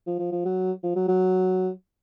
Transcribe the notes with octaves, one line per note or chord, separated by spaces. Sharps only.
F3
F3
F3
F#3
F3
F#3
F#3